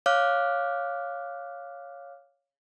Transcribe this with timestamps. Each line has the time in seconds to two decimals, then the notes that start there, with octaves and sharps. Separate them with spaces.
0.06 C#5 F5 D6 F6 F#6